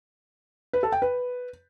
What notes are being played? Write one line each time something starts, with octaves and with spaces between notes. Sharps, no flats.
B4
A4
G5
B4